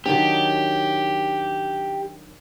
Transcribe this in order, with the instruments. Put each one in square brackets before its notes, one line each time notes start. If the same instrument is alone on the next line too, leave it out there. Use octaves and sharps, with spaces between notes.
[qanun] D#3 F#3 D4 [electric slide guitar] G4